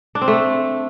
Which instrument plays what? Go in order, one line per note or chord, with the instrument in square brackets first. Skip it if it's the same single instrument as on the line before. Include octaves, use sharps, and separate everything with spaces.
[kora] D4
C4
A3